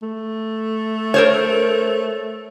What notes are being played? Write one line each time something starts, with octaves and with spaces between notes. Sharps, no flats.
A3
A#4 C5 C#5